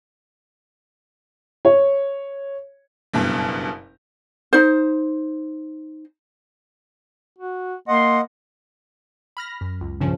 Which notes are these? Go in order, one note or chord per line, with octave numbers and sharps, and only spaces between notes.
C#5
F#1 G2 B2
D#4 C5
F#4
A#3 D#5 F#5 C6
B5 F6 A#6
F#2
C#2
A#1 G2 C#3 F3 C#4